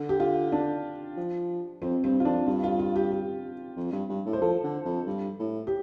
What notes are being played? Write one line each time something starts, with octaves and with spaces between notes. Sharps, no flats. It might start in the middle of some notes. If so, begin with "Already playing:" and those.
Already playing: D3
G4
F4
D4
F3
F2 C4
G2 C4
F4
F2 D4
G2 F4
F4
F4
G4
G4
F2
G2
G2
A2
C5
F3 A4
D3
F2
G2
A2
G4